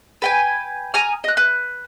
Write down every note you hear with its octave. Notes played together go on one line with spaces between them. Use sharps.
B4 G5 G#5
G#5 A#5 D#6 F6
D#5 F#6
B4